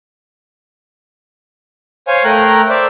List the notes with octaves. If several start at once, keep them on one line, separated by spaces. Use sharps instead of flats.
C5 C#5 F5 G#5
A3 A#4 G5 A#5 F6 F#6
C5 D5 E5